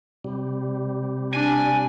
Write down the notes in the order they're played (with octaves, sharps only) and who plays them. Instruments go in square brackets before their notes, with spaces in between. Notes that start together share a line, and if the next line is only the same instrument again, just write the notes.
[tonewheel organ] C3 G3
[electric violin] D4 [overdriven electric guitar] G#5